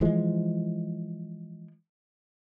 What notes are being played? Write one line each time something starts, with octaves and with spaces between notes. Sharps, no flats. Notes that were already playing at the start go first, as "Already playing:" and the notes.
E3 F3 G#3